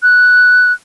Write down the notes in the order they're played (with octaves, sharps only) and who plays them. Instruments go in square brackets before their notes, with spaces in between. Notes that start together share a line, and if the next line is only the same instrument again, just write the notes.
[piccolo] F#6